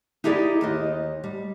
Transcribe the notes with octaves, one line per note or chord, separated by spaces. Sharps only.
D#4 E4 G4 G#4 C5 D5
D#2 C5 D#5
G3